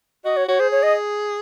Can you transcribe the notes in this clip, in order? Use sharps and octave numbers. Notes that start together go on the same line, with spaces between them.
F#4 D#5
C#5
F#4 C#5
G#4 C5
C#5
D#5